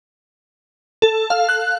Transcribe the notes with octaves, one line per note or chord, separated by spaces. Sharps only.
A4
F5
F#6